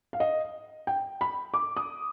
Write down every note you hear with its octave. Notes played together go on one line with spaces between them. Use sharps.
F5
D#5
G5
B5
D6
D#6